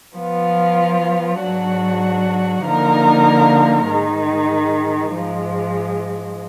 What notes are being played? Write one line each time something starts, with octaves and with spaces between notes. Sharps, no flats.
F3 B3 F4
G#2 F#3 D4 F#4
D3 F3 A#3 D#4 A#4
G#2 D#3 G#3 D#4
G#2 F3 G#3